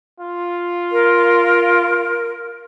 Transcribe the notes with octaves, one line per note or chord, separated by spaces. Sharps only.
F4
A#4